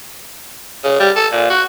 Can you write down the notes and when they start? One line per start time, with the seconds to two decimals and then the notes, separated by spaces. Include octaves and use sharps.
0.84 C#3
1.00 G3
1.16 A4
1.32 A#2
1.50 F#4